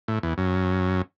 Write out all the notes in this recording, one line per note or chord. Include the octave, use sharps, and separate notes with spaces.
A2
E2
F#2